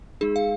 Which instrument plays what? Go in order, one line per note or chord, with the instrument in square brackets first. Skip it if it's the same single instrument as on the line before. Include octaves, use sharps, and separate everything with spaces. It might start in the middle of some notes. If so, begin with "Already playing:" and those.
[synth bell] G#3 D#4 G#4
F5